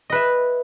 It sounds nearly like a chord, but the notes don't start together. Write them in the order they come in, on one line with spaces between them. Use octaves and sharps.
D#5 B4 E5